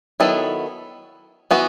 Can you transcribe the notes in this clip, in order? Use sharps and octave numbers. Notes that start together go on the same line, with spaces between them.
D#3 F#3 B3 E4 A4
E3 B3 F#4